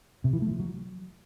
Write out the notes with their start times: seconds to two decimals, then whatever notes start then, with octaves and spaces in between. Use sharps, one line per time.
0.24 C3
0.33 E3
0.42 A3
0.51 F3
0.60 F#3